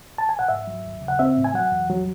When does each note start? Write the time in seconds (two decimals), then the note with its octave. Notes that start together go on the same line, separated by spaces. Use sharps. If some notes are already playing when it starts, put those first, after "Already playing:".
0.18 A5
0.29 G#5
0.39 F#5
0.49 G#2 E5
0.67 F#3
0.84 D#2
1.02 C#3
1.08 F#5
1.19 C4 E5
1.37 A2
1.44 G#5
1.54 F#3 F#5
1.72 E2
1.90 F#3